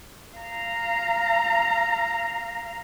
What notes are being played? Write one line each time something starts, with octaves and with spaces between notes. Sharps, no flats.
F5 A#5